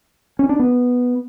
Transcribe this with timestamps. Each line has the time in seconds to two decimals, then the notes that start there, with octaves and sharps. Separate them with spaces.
0.39 C#4
0.49 D4
0.59 B3